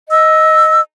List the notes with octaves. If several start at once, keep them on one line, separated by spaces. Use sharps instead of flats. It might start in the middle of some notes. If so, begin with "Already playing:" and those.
D#5 E6